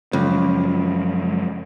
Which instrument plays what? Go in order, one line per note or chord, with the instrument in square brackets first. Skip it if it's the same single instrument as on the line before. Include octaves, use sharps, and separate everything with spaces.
[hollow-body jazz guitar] C#2 [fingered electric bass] F#2 F3